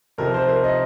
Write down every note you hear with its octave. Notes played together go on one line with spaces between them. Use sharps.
F2 C3 F3 A#4
C5
A#4
D#5